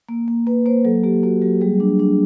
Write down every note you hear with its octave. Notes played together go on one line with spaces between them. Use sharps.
A#3
A#3
A#3 B4
A#3 C5
F#3 A4
A#3 G4
A#3 F#4
F#3 G4
G3 G#4
D4
D4